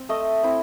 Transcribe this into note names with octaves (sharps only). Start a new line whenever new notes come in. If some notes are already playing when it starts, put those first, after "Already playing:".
Already playing: C4
A3 D#5
C4 E4